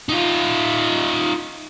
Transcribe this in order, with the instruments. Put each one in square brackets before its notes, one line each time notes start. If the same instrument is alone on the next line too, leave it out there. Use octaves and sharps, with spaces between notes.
[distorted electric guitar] D#4 F4